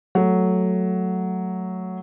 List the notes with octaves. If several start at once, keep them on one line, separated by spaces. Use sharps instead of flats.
F#3 A3